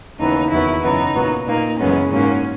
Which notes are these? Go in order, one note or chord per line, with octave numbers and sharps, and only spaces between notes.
D#2 C#3 E3 B3 D#4
E2 D#3 F#3 B3 E4
F#2 C#3 E3 B3 D#4
A#2 F#3 B3
A#2 A#3 D#4
F#2 C#3 E3 G#3 B3 C#4
G#2 F#3 A#3 C#4